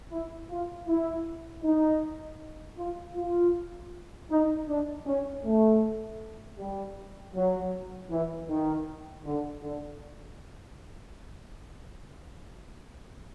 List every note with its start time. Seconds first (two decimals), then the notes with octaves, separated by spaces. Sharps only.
0.11 E4
0.50 F4
0.88 E4
1.64 D#4
2.77 F4
3.15 F4
4.30 D#4
4.68 D4
5.07 C#4
5.44 A3
6.58 G3
7.35 F#3
8.10 E3
8.49 D#3
9.24 D3
9.62 D3